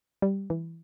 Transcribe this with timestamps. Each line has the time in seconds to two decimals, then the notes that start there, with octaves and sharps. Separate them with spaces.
0.22 G3
0.50 E3